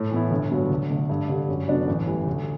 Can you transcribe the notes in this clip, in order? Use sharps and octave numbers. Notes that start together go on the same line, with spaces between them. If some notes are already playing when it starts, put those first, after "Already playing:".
Already playing: A2
E3 B3 E4
G1
G2 F#3 B3
D2
D3 A3
G2
D3 G3
F#2
D3 F#3 B3 D4
A1
A2 E3 G3
D2